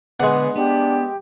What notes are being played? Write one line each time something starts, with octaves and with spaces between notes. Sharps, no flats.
D3 G#3 B3 G#4 D5 F#5
B3 D4 G4